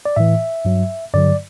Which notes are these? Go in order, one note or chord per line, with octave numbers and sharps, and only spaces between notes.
D5
A2 E3 E5
G2 F#3
G2 D3 F#3 D5